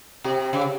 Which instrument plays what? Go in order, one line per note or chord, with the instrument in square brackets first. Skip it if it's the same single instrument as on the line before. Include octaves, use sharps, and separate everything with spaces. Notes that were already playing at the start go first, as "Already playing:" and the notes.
[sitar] C3 [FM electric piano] G4
[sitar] C#3